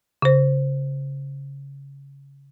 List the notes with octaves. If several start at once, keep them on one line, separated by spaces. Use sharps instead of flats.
C#3 C5